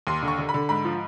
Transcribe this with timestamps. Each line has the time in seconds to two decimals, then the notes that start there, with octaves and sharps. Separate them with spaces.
0.07 D#2 C6
0.23 D3
0.28 C#6
0.38 D3
0.49 B5
0.54 D3
0.69 G#2 B5
0.85 F3